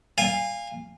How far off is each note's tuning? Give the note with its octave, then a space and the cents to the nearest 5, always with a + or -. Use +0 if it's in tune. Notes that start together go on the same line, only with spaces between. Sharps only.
F5 +0 G#5 -30